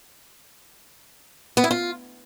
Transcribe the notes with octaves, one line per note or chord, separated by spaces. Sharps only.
B3
E4
F4